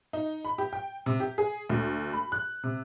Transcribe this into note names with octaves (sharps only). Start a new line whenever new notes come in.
D#4
B5
G4
G5
C3
G4
G#4
D2
B5
F#6
C3